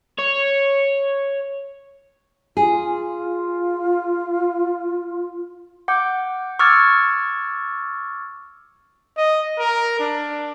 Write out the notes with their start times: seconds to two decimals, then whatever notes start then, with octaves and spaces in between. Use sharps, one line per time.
0.19 C#5
2.57 F4 G#4
5.88 F#5 D6 G6
6.59 C#6 D6 E6 F6 G#6 A6
9.17 D#5
9.59 A#4
9.99 D4